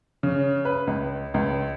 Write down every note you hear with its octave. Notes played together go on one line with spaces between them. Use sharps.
C#3
B4
C#2
C#2